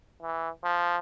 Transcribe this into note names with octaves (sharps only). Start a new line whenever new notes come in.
E3
F3